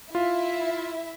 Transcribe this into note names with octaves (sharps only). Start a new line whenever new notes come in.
E4 F4 E5